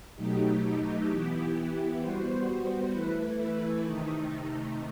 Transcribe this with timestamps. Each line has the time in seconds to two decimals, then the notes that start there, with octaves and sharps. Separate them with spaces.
0.15 B2 F#3 A3 D#4 G4
1.07 E3 B3 E4 G4
2.00 G3 B3 F#4 C5
2.92 E3 A3 E4 B4
3.84 C3 D#3 A3 D#4